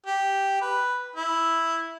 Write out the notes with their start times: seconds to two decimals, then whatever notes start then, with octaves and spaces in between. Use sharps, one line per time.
0.06 G4
0.62 B4
1.16 E4